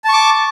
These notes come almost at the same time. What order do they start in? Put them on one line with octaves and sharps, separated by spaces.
A5 C#6 D6